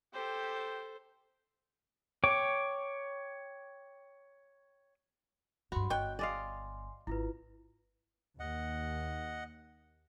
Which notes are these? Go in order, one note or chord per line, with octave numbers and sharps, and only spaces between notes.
G4 A4 C5
C#5 G5 D6
G2 F#3 F#4 B5 C6
G1 C#5 D#5 G5 F#6
D5 D#5 F5 G#5 C6
G#1 E4 F4 B4
D#2 D#5 F#5